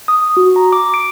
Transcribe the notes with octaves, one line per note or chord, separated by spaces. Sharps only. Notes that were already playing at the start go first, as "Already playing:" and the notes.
D#6
F#4
A#5
D6
D7